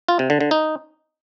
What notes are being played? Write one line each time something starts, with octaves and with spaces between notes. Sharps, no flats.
F4
C3
D3
D3
D#4